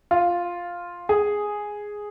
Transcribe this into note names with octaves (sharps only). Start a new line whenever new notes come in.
F4
G#4